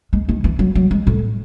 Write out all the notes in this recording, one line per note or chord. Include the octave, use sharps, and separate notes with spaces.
G#3
D#3
E3
F#3
F#3
G#3
A2